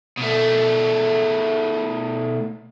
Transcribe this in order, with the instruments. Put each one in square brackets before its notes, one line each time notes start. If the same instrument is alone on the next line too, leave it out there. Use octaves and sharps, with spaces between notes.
[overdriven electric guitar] B2 A3